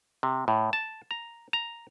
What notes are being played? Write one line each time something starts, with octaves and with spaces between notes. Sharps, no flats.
C3
A2
A5
A#5
A#5